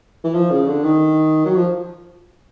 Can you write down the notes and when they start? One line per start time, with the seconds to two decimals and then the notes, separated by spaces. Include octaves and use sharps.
0.24 E3
0.34 F3
0.51 C#3
0.68 D3
0.84 D#3
1.46 F#3
1.56 F3